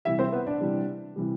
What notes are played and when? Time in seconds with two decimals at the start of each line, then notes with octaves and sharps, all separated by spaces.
0.05 C3 E3 G3 E4 E5
0.19 C4 C5
0.32 B3 B4
0.47 D4 D5
0.60 C3 E3 G3
1.16 C3 E3 G3